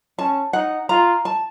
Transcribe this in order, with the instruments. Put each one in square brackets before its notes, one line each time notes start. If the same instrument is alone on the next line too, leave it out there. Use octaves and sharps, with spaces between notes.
[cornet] C#4 [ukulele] A5
[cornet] D#4 [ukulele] F#5
[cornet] F4 [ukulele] A#5
[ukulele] A5